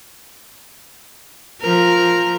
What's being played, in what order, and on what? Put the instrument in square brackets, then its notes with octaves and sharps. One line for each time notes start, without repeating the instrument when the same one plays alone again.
[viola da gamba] F3 A#4